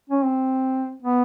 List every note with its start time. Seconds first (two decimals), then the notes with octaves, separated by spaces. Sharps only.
0.10 C#4
0.24 C4
1.02 B3